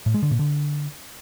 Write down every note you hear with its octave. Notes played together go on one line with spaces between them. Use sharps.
A2
G#3
D3
A#2
D3